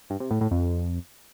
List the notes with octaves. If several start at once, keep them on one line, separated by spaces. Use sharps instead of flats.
G2
C3
A2
A2
F2